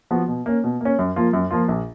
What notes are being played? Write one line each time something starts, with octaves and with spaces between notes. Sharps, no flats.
F3 B3 F#4
B2
A#3 C#4
B2
A#3 C#4
F#2
F3 A#3 F4
F#2
F3 A#3 F4
A#1